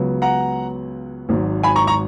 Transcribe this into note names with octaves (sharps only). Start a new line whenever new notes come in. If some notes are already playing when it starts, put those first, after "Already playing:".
Already playing: C#2 C#3 F#3 B3
F#5 A#5
G#1 G#2 F#3
G#5 B5
A#5 C#6
A#5 C#6